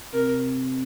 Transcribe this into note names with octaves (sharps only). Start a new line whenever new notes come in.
C3 A#4